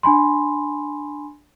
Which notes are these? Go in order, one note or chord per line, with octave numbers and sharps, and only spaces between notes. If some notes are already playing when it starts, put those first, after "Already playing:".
D4 G#5 B5 C6